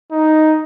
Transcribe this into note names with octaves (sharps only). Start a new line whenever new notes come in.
D#4